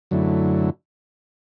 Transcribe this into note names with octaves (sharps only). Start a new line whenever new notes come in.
F#2 D3 F#3 A3 E4